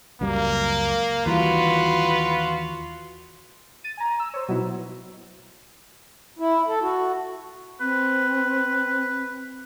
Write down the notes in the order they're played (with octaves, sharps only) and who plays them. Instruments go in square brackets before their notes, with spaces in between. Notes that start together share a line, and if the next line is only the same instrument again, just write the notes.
[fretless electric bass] C#2 F#2 G3 [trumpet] A#3
[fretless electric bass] D#2 E3 G3 [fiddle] F4 F#4 [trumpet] B4
[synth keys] A6 D#7
G#5 A#5
E6
C5 C#5
B2 F#3 B3 D#4 E4
[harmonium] E4
A4
F#4
[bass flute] C4 [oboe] B4